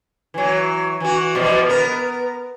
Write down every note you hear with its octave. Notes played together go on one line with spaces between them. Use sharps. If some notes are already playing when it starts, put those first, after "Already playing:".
E3 F#3
E3 F#4
B2 F3 G3
B3 A#4